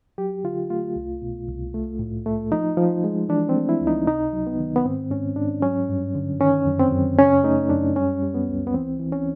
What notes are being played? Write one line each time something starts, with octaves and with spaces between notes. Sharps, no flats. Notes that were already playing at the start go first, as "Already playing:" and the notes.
F#3 G4
D3 F4
A3 F4
C2
B2
C2
A3
A2
A3
F3 D#4
F3
G#3
E3 D4
C4
A3
E4
C#2
D#4
C3 D#4
F#3
B3
D#3
B3
G#2 C4
G#2 C#4
G#2 D4
F#3 C#4
G2
D3
D#3 C#4
F#2
C4
F#2
C#3 C#4
A3 D#4
F#2 D4
G3 C#4
G3
B3
C#2
B3
E3 C4
E3
C#4